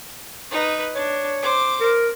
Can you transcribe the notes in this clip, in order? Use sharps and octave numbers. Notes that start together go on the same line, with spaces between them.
D#4 B4
D4 C#5
C5 D6
A#4